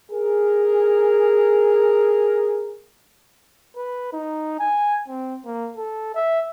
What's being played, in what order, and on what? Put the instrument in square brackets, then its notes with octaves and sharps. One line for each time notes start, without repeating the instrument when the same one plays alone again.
[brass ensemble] G#4 A#4
[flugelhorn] B4
D#4
G#5
C4
A#3
A4
E5